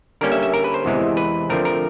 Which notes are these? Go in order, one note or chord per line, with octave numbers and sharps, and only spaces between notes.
D3 G3 A#3 C#4 A#4
E5
E5
A#4
B4
C5
E2 C3 E3 G#3
B4
D3 F3 A3 C4 A#4
A#4